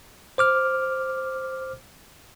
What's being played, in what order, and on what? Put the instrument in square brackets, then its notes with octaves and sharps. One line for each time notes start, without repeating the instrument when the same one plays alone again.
[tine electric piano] C5 D6 F6